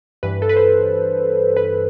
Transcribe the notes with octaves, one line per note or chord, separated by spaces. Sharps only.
G2 E3 B4
A4
B4
C5
B4